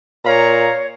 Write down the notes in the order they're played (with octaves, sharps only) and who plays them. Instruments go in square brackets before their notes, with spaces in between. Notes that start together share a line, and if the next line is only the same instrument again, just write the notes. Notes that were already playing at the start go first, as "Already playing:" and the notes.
[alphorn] A#2 [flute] C#5 [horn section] F5 A#5